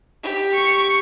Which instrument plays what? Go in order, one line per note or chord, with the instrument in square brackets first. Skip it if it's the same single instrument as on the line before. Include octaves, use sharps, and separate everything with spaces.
[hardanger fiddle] G4
[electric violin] C#6